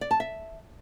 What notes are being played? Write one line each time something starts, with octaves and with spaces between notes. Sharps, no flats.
D5
A5
E5